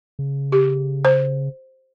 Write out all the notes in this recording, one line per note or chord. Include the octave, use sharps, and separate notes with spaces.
C#3
G4
C5